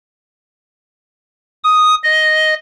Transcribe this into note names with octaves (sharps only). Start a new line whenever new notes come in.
D#6
D#5